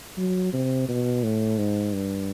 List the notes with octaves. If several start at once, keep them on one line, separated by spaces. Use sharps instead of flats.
F#3
C3
B2
A2
G#2
G2